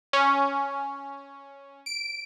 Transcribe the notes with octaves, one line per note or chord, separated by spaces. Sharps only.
C#4
D7